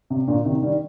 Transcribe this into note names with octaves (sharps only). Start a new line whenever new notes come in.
C3
A#2 D3
C3 D#3
D#3 G3